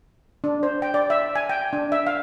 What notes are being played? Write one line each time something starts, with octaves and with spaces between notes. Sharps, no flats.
D4
C5
G5
D5
E5
G#5
G5
D4
E5
F5